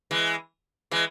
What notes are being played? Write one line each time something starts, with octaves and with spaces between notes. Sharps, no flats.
E3 G#3
E3 G#3